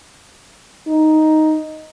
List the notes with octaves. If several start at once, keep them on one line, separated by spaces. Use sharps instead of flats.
D#4